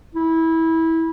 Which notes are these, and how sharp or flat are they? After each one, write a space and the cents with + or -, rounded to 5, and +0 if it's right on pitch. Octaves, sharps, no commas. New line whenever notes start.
E4 -20